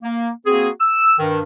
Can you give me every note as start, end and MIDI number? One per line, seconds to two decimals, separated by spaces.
0.03 0.30 58
0.46 0.69 58
0.46 0.69 60
0.46 0.69 66
0.46 0.69 68
0.81 1.19 88
1.19 1.41 43
1.19 1.41 51